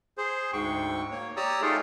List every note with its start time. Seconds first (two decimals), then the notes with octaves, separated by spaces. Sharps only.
0.18 G#4 C5
0.53 D2 G#2 G5 C#6
1.11 A#3 C#5
1.37 G4 C#5 D5 A#5 D#6 E6
1.62 A3 D#4 F4 G#4 A#4